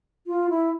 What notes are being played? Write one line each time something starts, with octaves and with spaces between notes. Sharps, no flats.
F4
E4